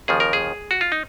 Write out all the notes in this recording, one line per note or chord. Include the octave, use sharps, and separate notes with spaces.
D#2 C#3 F3 G#4
A#4
G#4
F#4
F4
D#4